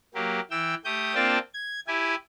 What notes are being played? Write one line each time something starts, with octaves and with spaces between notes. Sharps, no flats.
F#3 A#3 G4
E3 G5 E6
A3 G4 D#6 G6
A#3 C4 D4 F4 G5 A5
G#6
E4 G4 G#5